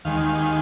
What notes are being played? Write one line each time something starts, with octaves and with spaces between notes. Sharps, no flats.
D#2 D#3 G#3 F5